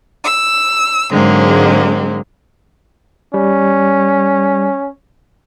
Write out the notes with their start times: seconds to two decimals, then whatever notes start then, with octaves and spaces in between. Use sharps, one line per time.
0.25 E6
1.11 G#2 D3 F#3 G#3 A#3 C4
3.34 G3 C#4